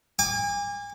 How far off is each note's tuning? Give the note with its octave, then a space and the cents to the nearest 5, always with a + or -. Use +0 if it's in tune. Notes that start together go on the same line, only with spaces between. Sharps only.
G#5 -35 D6 +0